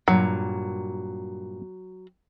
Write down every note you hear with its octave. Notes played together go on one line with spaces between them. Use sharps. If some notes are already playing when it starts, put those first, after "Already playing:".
G2 A#2 F#3